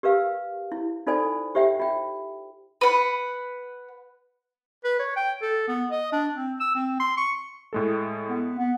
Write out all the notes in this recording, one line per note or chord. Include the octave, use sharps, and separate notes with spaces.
G4 A#4 B4 F5
E4
D#4 F4 A4 C5 D5 G#5
G4 C5 E5 F#5 G5
F4 G5
B4 F#5
B4
C#5
G5
A4
B3
D#5
D4
C4
E6
C4
C6
C#6
A2 G#3 A4
B3
B3